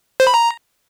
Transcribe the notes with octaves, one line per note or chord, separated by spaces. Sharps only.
C5
B5
A#5